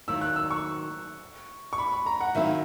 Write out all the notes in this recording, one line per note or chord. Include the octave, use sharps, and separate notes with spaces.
D#3 F#3 A#3 E4 E6
F#6
E6
C#6
C#6
B5
B5
A#5
F#5
D#3 F#3 A#3 C#4 E4 E5